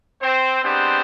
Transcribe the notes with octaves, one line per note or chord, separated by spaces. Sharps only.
C4 C5
G#3 B3 C4 D4 G4 C5